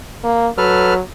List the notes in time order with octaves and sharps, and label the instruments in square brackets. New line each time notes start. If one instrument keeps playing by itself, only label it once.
[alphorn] A#3
[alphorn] F#3 [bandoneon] A4 B4 F6